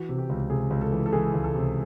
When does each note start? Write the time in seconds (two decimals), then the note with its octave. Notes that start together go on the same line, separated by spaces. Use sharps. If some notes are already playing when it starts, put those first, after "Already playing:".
Already playing: E3 F#4
0.09 C3
0.18 G4
0.29 C#2
0.50 C3 G#4
0.70 C#2
0.81 A4
0.92 E3
1.06 A4
1.13 E3 G#4
1.34 C#2
1.44 A4
1.55 C3